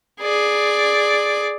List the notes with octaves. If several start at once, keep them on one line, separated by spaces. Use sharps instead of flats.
G#4 D5